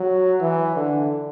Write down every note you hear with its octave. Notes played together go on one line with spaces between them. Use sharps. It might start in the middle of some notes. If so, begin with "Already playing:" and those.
Already playing: F#3
E3
D3